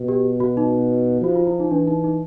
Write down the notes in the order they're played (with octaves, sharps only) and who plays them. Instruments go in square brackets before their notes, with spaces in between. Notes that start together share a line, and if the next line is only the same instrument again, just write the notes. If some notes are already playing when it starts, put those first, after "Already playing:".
Already playing: [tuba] B2
[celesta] G4
F#4
D#4
[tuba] F3 [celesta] F#4
[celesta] F4
E4
D#4
[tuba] E3 [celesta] D4
[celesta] D#4
D#4